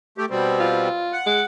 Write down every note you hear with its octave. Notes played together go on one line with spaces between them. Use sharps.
A3 G4
B2 G3 C4
F4
F#5
G#3